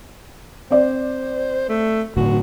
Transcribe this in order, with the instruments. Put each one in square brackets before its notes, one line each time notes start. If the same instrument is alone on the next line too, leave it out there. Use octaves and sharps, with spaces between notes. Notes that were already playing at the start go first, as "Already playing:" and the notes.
[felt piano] C4 D5 [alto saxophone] C5
[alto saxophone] A3
[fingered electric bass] G1 A2 D3 [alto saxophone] F#4